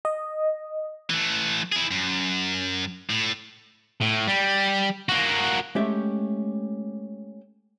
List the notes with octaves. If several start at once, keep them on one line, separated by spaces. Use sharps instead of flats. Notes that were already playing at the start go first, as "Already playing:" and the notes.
D#5
E3 A3
E4 G#4
F#2
A2
A2
G3
A#3 F#4
G#3 A3 C#4 G4 E5 G5